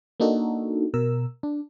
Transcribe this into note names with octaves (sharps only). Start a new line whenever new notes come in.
A#3 D4 D#4 F#4 A4
B2 A#4 E6
D4